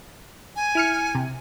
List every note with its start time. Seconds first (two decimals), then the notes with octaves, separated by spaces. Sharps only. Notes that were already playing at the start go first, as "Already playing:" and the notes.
0.56 G#5
0.75 E4 F6 C#7
1.15 C3